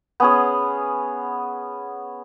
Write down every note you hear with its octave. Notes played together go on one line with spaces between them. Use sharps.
B3 C#4 G#4